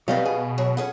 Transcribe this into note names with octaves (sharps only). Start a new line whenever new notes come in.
B2 F#3 G3 C4 B4 D#5 F5
G#4
F#3
C#4 G#4 F#5